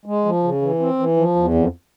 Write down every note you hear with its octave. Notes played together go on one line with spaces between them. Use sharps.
G#3
F3
C#3
E3
C4
E3
F3
E2
F2